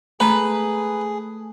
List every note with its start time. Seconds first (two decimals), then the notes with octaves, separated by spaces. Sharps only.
0.20 A3 G#4 B4 A#5